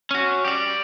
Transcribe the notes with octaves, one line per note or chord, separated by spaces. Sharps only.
C#4 F#4
G4 D5